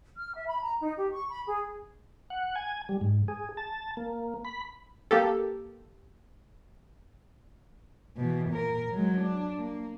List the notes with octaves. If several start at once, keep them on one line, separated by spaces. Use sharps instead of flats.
F6
E5
B5
A#5
D#4
G4
C#6
B5
G#4
F#5
G#5
G3
G#2
G#4
A5
A#3
B5
A#3 G4 A4
B2 E3
A#2 A#4
F#3 G#3
D4
A#3